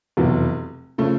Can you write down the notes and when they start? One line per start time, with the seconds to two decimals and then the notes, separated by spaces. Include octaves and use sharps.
0.17 F1 E2 B2 F#3
0.98 C#3 F3 A3